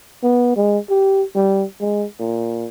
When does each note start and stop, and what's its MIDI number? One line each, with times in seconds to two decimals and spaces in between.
0.23 0.54 59
0.56 0.78 56
0.90 1.23 67
1.35 1.64 55
1.81 2.06 56
2.20 2.67 46